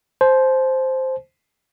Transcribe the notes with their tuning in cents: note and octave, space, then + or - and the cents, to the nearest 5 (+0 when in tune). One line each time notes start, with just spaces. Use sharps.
C5 +0 A5 -40